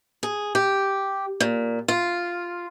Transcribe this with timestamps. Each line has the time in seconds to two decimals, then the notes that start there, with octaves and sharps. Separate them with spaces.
0.23 G#4
0.55 G4
1.40 A#2
1.88 F4